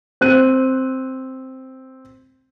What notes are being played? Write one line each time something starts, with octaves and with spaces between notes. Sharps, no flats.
C4 F#6 D#7